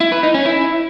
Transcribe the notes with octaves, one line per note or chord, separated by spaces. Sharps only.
E4
B4
D#4
C#4
E4